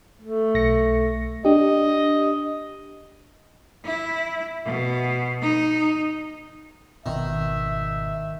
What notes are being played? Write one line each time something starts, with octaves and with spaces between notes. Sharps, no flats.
A3
B1 A#6 C#7
D4 G4 D#5
E4
B2
D#4
G#1 B2 D#3 E5